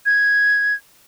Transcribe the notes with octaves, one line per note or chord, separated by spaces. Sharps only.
G#6